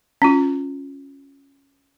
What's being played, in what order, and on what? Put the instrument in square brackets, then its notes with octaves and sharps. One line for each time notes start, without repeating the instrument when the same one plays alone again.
[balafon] C#4 F4